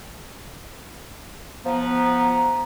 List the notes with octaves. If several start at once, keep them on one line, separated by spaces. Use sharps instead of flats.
F3 B3 A#5